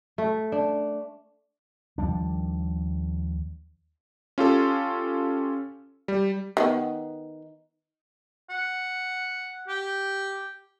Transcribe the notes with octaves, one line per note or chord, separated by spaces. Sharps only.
A3
D4
D#2 F3 G3 D4
C#4 F4 G4 A4
G3
D#3 A3 B3
F#5
G4